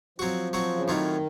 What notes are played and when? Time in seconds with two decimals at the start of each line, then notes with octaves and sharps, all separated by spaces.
0.18 F3 F#3 C4 F#4
0.53 F#3 C4 F#4
0.76 C#3
0.87 A2 D#3 F#3 C4 F4